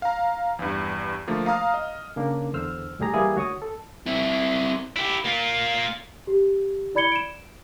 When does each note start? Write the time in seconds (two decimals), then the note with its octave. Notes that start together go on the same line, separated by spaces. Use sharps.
0.02 F5 A#5
0.59 E2 G2
1.27 D3 F3 A3 A#3
1.46 F5 A#5 D#6 F6
1.74 D#5
2.16 C#3 A#3 D4
2.54 E2 D3 C5 E6 F6
2.99 D2 A2 G3 G4 G#4 A#5
3.14 E3 G3 A#3 E4 G#4
3.35 D2 F#4 C#5 C#6 D#6
3.62 A4
4.06 C4 E4
4.96 E4 G4
5.25 A#3 F4
6.27 G4
6.95 E4 D5 B5 G#6 C#7 G7
7.12 D7 E7